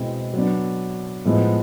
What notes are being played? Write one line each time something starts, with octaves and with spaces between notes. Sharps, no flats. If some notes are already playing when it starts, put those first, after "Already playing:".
Already playing: B2 G#3 C4 E4
F#3 B3 D4
A2 F3 G#3 B3